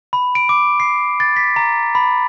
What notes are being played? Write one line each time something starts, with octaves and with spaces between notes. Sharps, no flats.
B5
D7
D6
C7
A6
B6
A#5
B5